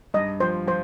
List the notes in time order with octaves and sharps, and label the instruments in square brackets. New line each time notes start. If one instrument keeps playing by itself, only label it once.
[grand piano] G2 [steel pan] D#5
[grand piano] F3 [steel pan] C5
[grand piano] F3 [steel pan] C5